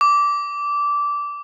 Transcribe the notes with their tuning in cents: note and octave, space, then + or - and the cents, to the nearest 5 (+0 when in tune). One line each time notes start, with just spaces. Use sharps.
D6 -15